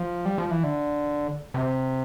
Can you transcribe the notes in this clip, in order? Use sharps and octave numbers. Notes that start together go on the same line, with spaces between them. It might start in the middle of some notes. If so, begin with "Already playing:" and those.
Already playing: F3
G3
F3
E3
D3
C3